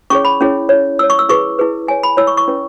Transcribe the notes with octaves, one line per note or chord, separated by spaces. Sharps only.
C#4 E4 G#4 C#5 C#6
B5
C#4 E4 G#4 C#5
E4 C#5
E4 C#5 E6
C#6
E6
E4 G#4 B4 C#6
E4 G#4 B4
E4 C#5 G#5
B5
E4 C#5 E6
C#6
C#6
C#4 E4 B4